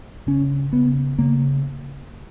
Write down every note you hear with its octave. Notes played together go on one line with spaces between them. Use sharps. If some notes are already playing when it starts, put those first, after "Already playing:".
C#3 C#4
C#3 B3
C#3 A#3